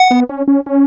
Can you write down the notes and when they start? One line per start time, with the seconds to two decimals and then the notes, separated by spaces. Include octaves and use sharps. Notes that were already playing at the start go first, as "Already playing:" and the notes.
Already playing: F#5
0.11 B3
0.29 C#4
0.48 C#4
0.66 C#4